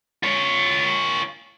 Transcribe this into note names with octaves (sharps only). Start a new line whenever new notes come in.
F4 C#5